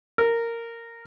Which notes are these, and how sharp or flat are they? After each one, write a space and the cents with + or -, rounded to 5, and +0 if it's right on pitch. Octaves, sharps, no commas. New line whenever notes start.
A#4 -10